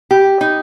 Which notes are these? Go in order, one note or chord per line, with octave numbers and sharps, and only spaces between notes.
G4
D#4